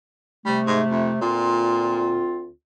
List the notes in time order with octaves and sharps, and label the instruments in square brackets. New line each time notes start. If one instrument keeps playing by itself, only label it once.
[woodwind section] C3 A3 [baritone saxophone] G3
[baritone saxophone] G#2
F2
[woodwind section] D2 C4 F4 [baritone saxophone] A#2